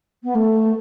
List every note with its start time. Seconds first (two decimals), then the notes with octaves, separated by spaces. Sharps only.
0.23 B3
0.34 A3